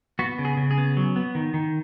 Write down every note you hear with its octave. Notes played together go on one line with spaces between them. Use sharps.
B3 F#4
C#3
G#4
C#3
G#4
B3
F#3
B3
D#3
D#3